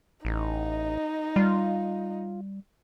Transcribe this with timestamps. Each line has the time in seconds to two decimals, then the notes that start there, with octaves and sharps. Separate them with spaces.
0.25 A1 D#4 D#5
1.36 G3 F4